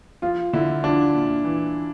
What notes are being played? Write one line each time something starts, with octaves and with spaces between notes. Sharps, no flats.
F3 F4
D3 E4
F3 D4
A#2
E3